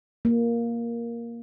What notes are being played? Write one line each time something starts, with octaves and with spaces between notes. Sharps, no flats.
A#3